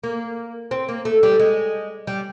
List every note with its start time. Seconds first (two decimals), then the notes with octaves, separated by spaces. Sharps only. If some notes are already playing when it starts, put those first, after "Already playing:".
0.04 A#3
0.71 C4
0.89 A#3
1.05 A3
1.23 G3
1.39 G#3
2.07 G3